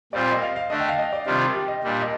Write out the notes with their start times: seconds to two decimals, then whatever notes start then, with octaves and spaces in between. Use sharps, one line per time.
0.13 A#2 G3 C4 F4 D5
0.22 F5
0.32 D#5
0.42 F5
0.56 F5
0.70 D3 A3 D4 D#5
0.80 G5
0.88 F5
0.99 D#5
1.13 D5
1.26 C3 D#3 G3 D4 F4
1.55 G4
1.68 D#5
1.83 A#2 G3 D4
2.02 D#5